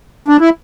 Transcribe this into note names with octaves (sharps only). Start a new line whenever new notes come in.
D4
E4